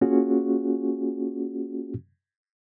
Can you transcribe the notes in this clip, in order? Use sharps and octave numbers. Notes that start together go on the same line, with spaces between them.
A#3 C#4 F4 F#4 G#4